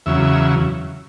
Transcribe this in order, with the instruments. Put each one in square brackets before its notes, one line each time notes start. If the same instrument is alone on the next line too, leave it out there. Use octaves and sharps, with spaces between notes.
[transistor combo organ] E2 C#3 F#3 E5